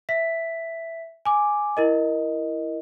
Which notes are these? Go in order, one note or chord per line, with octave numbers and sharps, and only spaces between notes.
E5 B6
G#5 D6
E4 A#4 D#5